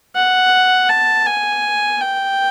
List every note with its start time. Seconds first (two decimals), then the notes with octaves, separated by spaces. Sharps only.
0.16 F#5
0.89 A5
1.26 G#5
2.01 G5